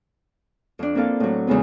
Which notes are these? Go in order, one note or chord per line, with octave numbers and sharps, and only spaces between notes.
F2 D4
A#3 C4 E4 F4 A4 F5
A2 F#3
E2 C#3 G#3 B3